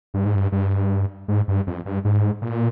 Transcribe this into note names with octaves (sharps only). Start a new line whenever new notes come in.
G2
G#2
G2
G2
G#2
G2
F2
G2
G#2
A#2